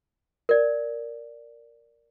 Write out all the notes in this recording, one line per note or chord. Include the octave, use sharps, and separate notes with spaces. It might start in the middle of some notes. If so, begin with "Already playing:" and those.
A#4 D5